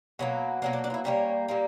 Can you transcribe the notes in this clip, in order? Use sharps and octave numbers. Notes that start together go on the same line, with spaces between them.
B2 F#3 A#3
B2 F#3 A#3 D4
D4
D4
F4
E4
A#2 G3 A#3 C#4
A#2 G3 A#3